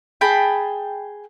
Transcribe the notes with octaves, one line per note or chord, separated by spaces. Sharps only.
G#4 G5 A5 B5